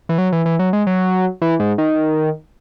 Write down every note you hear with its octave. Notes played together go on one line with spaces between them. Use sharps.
E3
F#3
E3
E3
F#3
G#3
F#3
E3
G#2
D#3